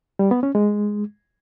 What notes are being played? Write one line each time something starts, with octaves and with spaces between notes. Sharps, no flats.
G3
B3
C#4
G#3